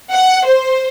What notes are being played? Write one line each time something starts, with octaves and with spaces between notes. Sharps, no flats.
F#5
C5